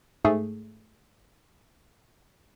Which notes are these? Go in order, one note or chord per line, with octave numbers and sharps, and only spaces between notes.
G#2 A3 G#4